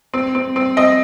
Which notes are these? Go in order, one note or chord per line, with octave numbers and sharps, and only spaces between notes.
C4
C4
C4
C4 D#5